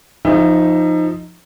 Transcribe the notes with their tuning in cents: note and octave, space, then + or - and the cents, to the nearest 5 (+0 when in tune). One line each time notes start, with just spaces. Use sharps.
F3 +0 D#4 +0 E5 +25